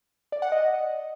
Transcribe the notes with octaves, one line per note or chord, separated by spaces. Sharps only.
D5
F#5
D#5